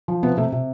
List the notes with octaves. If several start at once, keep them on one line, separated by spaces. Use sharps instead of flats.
F3
C3 B3
C3 A3
C3